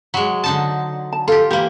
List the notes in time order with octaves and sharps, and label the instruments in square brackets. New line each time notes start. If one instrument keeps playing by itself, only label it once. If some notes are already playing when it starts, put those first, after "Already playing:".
[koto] F#3 G#3
D3 D#4 A5
[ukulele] A5
[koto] F4 G4 [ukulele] A4
[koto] E3 A#3 [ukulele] G4